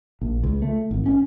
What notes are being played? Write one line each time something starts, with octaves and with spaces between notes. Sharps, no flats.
A#1
C#2
A3
G#1
C#4